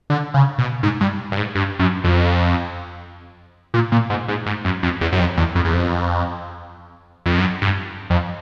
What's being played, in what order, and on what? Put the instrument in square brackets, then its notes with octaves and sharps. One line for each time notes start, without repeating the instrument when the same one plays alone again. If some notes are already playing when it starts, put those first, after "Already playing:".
[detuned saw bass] D3
C#3
B2
G#2
G2
G2
G#2
G2
F#2
F2
A#2
A#2
G#2
G#2
G#2
F#2
F2
E2
F#2
F2
E2
F2
E2
F2
F2
F#2
G2
F2